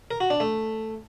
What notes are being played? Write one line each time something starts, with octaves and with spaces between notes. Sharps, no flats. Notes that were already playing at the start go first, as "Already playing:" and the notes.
A#4
F#4
D4
A3